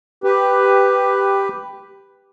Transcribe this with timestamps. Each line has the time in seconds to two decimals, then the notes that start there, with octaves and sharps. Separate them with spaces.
0.24 G4 B4